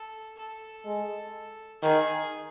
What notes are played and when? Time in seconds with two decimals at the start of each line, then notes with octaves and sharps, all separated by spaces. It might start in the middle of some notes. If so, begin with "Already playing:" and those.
Already playing: A4
0.37 A4
0.85 G#3
1.82 D#3 G#4